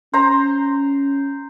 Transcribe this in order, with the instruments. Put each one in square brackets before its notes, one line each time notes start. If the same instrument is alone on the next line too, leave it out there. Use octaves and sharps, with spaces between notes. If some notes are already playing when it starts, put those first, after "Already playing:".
[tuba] C#4 [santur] C5 A#5